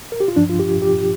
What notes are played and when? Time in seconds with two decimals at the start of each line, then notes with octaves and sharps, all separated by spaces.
0.12 A#4
0.20 G4
0.28 F4
0.36 G2 F3 D4
0.50 F4
0.59 G4
0.82 G4